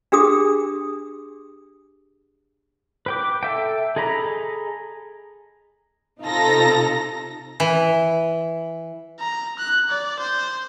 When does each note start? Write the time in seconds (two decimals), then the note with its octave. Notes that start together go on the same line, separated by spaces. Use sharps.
0.12 D4 G4 G#4 D#6
3.06 B4 G5 D6
3.43 A4 E5 G5
3.96 G#4 A4 D#5 A#5 B5
6.21 C3 D#4 F4 A4 A#5 A#6
7.60 E3
9.20 A#5
9.59 F#6
9.90 D5
10.20 C5